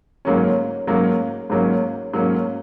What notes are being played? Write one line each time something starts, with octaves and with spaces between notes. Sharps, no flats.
G#2 F#3 A#3 C#4
G#2 F#3 A#3 C#4
G#2 F#3 A#3 C#4
G#2 F#3 A#3 C#4